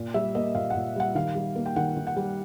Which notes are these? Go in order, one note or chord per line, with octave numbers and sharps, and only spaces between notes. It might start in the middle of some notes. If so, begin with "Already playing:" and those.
Already playing: A#2
G3 E5
A#3 D#5
A#2 F5
F#5
A#2
G3 F#5
D#3 F5
G3
A#3
G5
D#3 F#5
D#3
F#5
G3